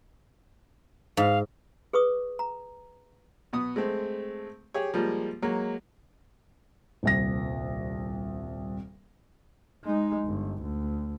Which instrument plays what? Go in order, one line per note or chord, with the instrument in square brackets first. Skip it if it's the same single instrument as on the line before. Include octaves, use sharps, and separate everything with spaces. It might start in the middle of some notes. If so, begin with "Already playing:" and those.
[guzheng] G#2 [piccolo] F5
[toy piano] G#4 B4 C#6 D#6
A#5
[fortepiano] B2 B3 D#6
G#3 A3 C4
G4 G#4 C#5
F3 G3 G#3 A#3
F#3 G#3 A#3
[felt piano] D#1 C2 A#6
[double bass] G#3 D#4
G1
D2